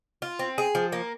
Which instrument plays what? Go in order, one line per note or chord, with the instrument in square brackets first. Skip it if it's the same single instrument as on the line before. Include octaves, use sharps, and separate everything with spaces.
[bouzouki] F4
C4
G#4
F3
A#3